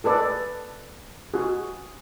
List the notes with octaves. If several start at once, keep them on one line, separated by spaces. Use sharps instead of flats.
G#4 A4 B4 D5
F#4 G#4